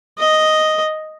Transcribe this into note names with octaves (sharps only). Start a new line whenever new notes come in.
D#5